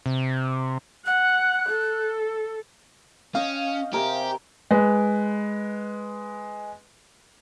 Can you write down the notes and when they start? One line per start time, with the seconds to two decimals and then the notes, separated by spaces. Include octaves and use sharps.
0.06 C3
1.06 F#5 F#6
1.69 A4
3.35 C#4 D#5 F5 G5
3.93 C3 C4 G4 A#4 G#5
4.71 G#3 B4